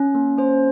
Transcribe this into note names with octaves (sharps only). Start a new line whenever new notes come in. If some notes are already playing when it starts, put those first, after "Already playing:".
Already playing: C#4
A#3
C#4 C5